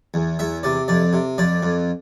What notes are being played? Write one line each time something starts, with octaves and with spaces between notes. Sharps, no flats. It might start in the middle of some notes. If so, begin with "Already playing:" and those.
E2
E2 E5
C3 D5
F2 D5
C3
F2 D5
F2